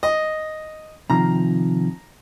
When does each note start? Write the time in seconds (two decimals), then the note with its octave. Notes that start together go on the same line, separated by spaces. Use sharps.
0.03 D#5
1.10 C3 D#3 F3 A#5